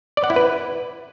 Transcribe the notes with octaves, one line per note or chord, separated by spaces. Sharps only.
D5
F#5
E4
B4